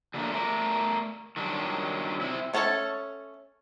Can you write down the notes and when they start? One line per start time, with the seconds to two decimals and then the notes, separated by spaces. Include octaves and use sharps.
0.14 D3 F#3 G3 A3 A#3 D4
0.32 A3 A#4 D5
1.37 D#3 F#3 G3 D4
2.21 C3 C4 E4
2.54 A3 C#4 A4 C#5 A5